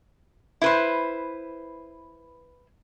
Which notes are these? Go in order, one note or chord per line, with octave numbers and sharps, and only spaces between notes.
E4 B4 C5